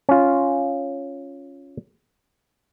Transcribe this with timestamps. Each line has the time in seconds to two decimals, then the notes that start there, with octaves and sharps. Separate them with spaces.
0.09 C#4 F4